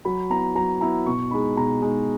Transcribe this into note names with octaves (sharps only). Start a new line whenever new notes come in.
F#3 B5
B3 E4 A#5
F#3 A#5
B3 E4 A#5
B2 C#6
G#3 D#4 B5
B2 A#5
G#3 D#4